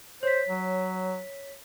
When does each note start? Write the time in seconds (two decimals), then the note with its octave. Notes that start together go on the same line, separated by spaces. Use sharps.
0.23 C5 C#5 B6
0.49 F#3